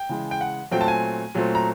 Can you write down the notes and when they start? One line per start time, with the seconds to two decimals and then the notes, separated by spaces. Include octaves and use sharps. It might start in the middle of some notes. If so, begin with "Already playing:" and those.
Already playing: G5
0.09 C#3 E3 G#3
0.31 G5
0.41 F#5
0.71 A#2 F#3 A3 C4 G5
0.81 A5
0.88 G#5
1.35 A#2 F#3 A3 C4
1.55 A#5